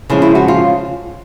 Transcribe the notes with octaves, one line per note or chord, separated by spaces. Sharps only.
C#3 F3 G#3 E4
E4
F#4
F4